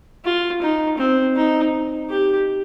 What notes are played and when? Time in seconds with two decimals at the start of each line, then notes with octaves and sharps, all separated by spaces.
0.25 F4
0.62 D#4
0.98 C4
1.36 D#4
2.10 G4